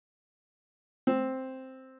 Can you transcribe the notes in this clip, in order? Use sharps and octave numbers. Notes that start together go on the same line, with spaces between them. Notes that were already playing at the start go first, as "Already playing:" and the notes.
C4